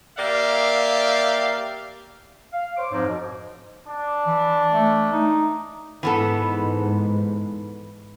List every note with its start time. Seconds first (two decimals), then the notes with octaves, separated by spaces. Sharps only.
0.17 A#3 G4 D5 E5 F5
2.52 F5
2.76 C5 C#5 D6
2.91 F2 G#2 F3 D#4
3.06 B2
3.86 D4
4.27 E3
4.72 A3
5.12 D#4
6.03 G#2 E3 B3 A4